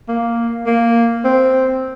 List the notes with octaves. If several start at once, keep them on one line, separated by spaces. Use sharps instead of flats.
A#3
A#3
C4